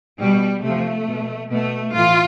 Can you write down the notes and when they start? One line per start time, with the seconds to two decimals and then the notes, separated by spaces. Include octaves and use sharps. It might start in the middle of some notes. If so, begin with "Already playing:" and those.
0.20 B2 G3
0.63 C3 F3 A3
1.07 B2
1.50 B2 A3
1.94 A2 E3 F4